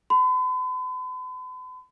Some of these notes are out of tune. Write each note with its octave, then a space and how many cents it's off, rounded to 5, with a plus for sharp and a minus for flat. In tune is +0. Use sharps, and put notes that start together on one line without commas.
B5 +45